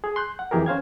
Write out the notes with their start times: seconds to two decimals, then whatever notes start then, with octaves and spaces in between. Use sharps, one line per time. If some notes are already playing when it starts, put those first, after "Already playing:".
0.04 G#4
0.16 C6 F#6 G6
0.39 F#5
0.51 F2 D#3 E3 G4 G#4 A#4
0.66 C#4 C5 F5 G#6